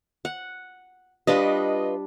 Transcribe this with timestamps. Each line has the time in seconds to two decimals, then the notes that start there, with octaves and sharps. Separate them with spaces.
0.25 F#5
1.27 G3 D4 F4 B4 D#5